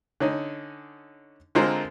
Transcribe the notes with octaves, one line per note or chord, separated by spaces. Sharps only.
D3 C#4 D#4
D3 G#3 C4 F4 A#4 C5